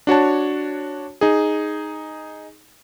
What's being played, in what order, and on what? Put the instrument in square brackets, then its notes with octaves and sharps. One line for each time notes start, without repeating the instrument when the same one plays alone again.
[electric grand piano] D4 F#4 C#5 A5
D#4 G#4